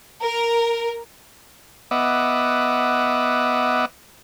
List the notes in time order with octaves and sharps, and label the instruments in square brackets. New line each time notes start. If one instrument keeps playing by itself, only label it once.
[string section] A#4
[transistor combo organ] B3 D#5 E5 F#5 D6